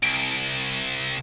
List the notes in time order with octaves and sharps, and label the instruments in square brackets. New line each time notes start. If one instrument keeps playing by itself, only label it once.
[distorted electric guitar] C2 [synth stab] D7